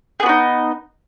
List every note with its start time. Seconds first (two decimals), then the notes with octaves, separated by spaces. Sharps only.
0.20 G#4
0.23 B3
0.26 F#4
0.29 D#4